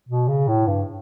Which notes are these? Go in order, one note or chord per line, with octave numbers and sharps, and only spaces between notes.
B2
C#3
A2
G2